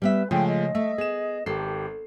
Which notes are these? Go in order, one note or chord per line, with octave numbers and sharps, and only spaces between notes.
G3 B3 B4 E5
C#3 F3 G#3 A3 G5
D#5
A3 E5
B3 G#4 E7
G#1 G4 A4 C7